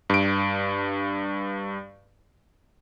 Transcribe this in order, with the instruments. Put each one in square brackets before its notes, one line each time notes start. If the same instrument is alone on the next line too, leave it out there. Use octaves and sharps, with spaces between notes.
[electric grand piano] G2 D7